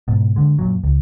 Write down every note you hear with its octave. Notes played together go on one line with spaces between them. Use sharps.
G#2 B2
D3 G#3
F#2 A#2 F#3
C#2